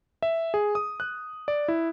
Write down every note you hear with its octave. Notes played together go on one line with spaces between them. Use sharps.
E5
G#4
D#6
F#6
D5
E4